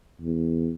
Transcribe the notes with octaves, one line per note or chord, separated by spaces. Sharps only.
E2